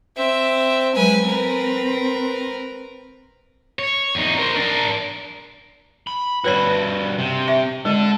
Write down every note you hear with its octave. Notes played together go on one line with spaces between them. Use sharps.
C4 E5
F#3 G#3 B4 G#5
C4 A#4 B4
C#5
E2 D#4
A#4 C5
D4 A#4
B5
G2 F#4 B4 C#5 B5
C3
E5
G#3 D4 A4